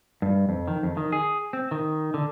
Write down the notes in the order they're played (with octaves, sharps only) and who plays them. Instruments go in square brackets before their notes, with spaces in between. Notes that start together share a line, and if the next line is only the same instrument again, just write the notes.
[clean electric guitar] G2
F2
D#3
F2
D#3
G#4
C4
D#3
D3